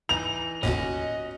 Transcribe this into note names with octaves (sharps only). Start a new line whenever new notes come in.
E3 D#4 D#5 F7
G1 D#2 A2 C#4 F#4 D#5